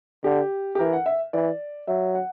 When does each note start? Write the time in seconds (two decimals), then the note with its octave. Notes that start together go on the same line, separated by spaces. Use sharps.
0.24 D3 G4
0.75 G4
0.79 E3 A#4
0.93 F#5
1.06 E5
1.33 E3 D5
1.87 F#3 E5
2.15 F#5